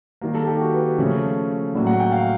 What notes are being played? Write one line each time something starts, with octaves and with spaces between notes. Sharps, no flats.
D#3 G3 A#3
A4
G4
F#4
B4
C#3 F3 A3 C#4
A2 F#3 A#3 D5
F#5
G5
F5